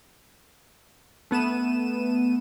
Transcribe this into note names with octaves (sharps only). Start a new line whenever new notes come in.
A3 B3 D#7 E7